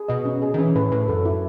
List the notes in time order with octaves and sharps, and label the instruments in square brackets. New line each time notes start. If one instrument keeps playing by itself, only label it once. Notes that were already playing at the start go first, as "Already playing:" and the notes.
Already playing: [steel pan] G#4
[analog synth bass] B2 [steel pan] D#5
[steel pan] C#4
G#4
[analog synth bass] D#3
[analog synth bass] E3 [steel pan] C#4
[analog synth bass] A2 [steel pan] B4
[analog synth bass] A2 [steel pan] B4
[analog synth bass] F#2 [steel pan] A4
[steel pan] E4